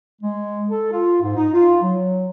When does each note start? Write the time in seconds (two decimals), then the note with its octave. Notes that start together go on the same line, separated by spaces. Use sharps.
0.21 G#3
0.69 A4
0.91 F4
1.21 G#2
1.36 D#4
1.53 F4
1.81 F#3